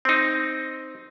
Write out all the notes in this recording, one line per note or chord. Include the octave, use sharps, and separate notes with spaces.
C4 D#4